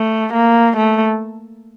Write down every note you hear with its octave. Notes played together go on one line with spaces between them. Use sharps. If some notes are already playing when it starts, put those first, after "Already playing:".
Already playing: A3
A#3
A3